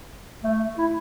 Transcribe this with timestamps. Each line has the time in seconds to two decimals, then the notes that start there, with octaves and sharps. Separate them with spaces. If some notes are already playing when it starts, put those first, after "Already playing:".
0.44 A3
0.78 E4